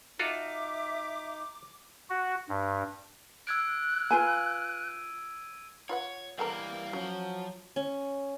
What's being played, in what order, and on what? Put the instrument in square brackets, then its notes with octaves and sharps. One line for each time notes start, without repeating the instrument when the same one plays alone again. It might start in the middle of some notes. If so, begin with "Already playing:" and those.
[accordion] D#4 [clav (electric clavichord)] F4 F#4 A4 [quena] E5 [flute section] D6
[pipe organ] F#4
G2
[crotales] E6 G#6 D7 [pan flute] F#6
[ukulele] F4 B4 G#5 [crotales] D#7
[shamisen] F4 B4 F#5 [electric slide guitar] C#5
[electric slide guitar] E3 G3 [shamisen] B3 A4 A#4 [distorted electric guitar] F5 A#5
[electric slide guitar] F3 C5 [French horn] F#3 [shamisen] C#4
[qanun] C#4